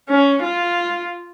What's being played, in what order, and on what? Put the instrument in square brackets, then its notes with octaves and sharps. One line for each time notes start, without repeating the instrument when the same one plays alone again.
[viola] C#4
F4